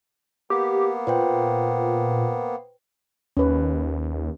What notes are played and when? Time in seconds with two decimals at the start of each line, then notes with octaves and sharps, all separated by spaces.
0.50 A#3 B3 G4
1.07 A#2 B4 C5 G5
3.37 D#2 C#4 B4